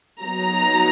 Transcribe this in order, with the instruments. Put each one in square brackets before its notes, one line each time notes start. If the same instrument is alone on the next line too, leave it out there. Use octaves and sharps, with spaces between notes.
[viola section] F#3 B3 D#4 A#5